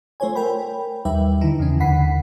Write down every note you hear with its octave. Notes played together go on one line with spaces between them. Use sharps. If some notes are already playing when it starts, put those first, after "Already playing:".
A3 F4 C5 C#5 G#5
A#4 G5 B5
D#2 G3 D#4 B4 E5 G5
D3 D#3 D#4 E4
E2 C#3 C#4
D#2 D3 F#5 B5 B6 C7